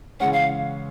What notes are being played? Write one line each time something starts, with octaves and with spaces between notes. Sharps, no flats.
C#3 E3 G#3 C#4 F#5
F5